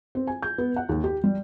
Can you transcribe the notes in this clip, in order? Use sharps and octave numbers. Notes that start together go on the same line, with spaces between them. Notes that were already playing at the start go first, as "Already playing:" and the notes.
C4
G#5
G6
B3
F#5
D#2
G4
G3